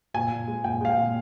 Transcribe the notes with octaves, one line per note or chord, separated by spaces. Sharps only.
A#2 G#5
A#2
G#3
A#2 G5
G#3 F5
G5
A#2